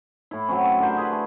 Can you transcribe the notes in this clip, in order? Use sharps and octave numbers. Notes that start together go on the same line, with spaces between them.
A2 E4
F#3 C4 C#4
C#4
D3 G4 A#4 C5
G#4 B4 B5
A3